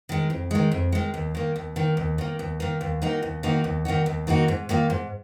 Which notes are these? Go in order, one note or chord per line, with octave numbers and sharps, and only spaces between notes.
D#3 G#3
F2
D#3 G#3
F2
D#3 G#3
D#2
D#3 A#3
D#2
D#3 A#3
D#2
D#3 A#3
D#2
D#3 A#3
D#2
D#3 A#3 D#4 F#4
D#2
D#3 A#3 D#4 F#4
D#2
D#3 A#3 D#4 F#4
D#2
D#3 A#3 D#4 F#4
G#2
D#3 A#3 F4
G#2